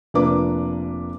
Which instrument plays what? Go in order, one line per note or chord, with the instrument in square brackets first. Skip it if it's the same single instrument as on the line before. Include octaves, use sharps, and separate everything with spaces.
[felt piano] F1 F3 A#3 D4 B4 D6